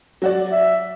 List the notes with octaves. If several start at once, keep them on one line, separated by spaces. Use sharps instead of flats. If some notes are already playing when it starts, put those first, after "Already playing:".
F#3 F#4 D5
E5